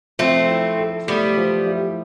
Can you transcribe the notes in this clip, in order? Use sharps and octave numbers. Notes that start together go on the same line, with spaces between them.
F3 A3 C4
E4
A4
G3 A3 B3
F3
E4